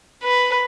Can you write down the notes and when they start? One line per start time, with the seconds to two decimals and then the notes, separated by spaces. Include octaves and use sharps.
0.24 B4